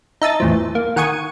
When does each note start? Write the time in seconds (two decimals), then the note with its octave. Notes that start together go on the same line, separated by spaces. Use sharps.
0.22 D#4 E5 A5 D#6 A6
0.40 E2 A2 F3
0.75 A#3
0.96 D#3 F#5 G#5 C#6 D#6 G#6